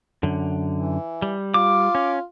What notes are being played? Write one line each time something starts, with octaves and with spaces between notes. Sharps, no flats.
F#2 D3
E3
G3
F4 D6
C#4